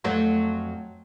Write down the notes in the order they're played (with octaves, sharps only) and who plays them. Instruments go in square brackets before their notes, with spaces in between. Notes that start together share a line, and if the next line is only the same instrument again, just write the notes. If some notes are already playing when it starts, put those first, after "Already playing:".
[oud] F2 F#3 A3